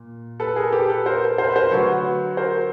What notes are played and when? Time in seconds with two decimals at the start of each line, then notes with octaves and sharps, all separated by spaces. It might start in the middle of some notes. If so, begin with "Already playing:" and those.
Already playing: A#2
0.40 A4 B4
0.56 G#4 A#4
0.72 G4 A4
0.89 A4 B4
1.06 A#4 C5
1.38 A#4 C5
1.49 B4
1.56 A#4 C5
1.71 D3 F#3 A3 B4 C#5
2.37 A#4 C5